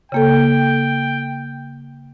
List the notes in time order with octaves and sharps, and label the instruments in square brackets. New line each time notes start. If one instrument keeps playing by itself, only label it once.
[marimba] C#3 A#3 A4 [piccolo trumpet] G5